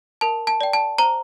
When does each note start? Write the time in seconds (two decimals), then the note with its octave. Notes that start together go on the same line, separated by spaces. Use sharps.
0.21 A#4 A5
0.47 A5
0.61 D5 G5
0.73 A5
0.98 C5 A#5